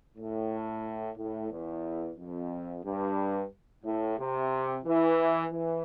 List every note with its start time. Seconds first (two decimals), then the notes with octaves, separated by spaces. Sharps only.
0.18 A2
1.17 A2
1.51 E2
2.18 F2
2.84 G2
3.84 A2
4.18 C3
4.85 E3
5.51 E3